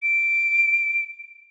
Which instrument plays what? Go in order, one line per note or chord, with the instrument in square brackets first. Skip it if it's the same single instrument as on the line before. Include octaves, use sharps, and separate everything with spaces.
[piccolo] D7